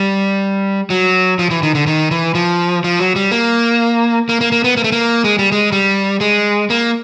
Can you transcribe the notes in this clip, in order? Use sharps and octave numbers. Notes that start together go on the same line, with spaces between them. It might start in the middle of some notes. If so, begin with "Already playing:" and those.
Already playing: G3
F#3
F3
E3
D#3
D3
D#3
E3
F3
F3
F#3
G3
A#3
A#3
A#3
A#3
B3
A#3
A3
A#3
G#3
G3
G#3
G3
G#3
A#3